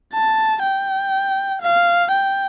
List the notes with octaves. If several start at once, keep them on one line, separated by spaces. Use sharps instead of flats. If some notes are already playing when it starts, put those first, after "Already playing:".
A5
G5
F5
G5